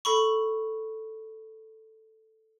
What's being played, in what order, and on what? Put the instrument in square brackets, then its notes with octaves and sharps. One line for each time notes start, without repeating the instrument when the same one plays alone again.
[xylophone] A4 B5 C#6